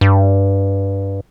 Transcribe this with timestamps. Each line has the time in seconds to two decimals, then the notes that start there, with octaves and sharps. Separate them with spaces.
0.01 G2